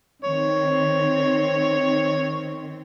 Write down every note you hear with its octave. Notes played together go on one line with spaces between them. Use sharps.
D#3 C4 C#5